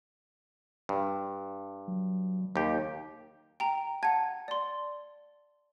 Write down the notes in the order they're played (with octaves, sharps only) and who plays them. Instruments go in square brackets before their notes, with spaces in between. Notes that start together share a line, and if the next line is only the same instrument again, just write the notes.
[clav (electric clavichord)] G2
[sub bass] F#3
[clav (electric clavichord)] D#2 G4
[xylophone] G5 A#5
[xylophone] F#5 G#6 [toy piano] A5
[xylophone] D5 C6